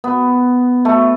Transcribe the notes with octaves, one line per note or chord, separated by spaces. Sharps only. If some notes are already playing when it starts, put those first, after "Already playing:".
B3
A3